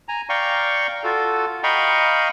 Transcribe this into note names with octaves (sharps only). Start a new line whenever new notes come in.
G#5 A#5
D5 F5 G5 A#5 C#6
F4 F#4 A4
D#5 F5 G5 A#5 B5 C#6